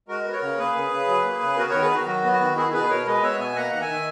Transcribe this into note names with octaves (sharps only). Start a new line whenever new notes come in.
G#3 F#4 A#4
B3
A#4 C#5
C#3
A#3 G#4 B4
C#3
C#3
F#3
A#3
C#3
B3 F#4 A#4
D#3 A#4 C#5
G#4 B4
D#3 F#4 A#4
F#3 F#4
B3
F#4
D#3
B3 E4 G#4
B2 G#4 B4
B2 A#4 C#5
G#3 B4 D#5
B3 C#5 E5
B2 E5 G#5
A#3 F#5 A#5
D#3 F#5
E5 G#5
D#3